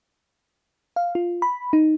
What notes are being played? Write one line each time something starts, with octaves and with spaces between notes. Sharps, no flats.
F5
F4
B5
D#4